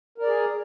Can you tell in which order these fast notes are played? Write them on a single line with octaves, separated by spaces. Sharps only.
A#4 D5 G#4